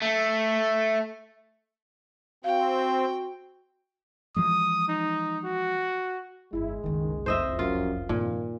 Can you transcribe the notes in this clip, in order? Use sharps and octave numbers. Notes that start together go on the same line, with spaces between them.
A3
C4 F#4 F5 G5
E3 F3 G#3 D#6
D#4
F#4
G1 F2 G#3 E4
F#1 C2 D#3
F2 C5 D#5 E5
F#2 F4
G2 A#2 D#3